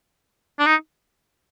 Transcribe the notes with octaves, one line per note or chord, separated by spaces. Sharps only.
D4
D#4